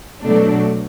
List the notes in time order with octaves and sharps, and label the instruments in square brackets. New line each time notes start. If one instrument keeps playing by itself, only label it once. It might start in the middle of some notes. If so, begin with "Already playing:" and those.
[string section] B2 F#3 A3 D4